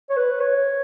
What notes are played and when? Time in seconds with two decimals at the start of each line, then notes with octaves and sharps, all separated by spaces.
0.10 C#5
0.17 B4
0.40 C#5